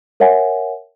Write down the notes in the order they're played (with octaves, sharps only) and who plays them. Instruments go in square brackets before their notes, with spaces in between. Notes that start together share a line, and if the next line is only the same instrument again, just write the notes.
[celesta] A#4 C#5 E5 F#5 G#5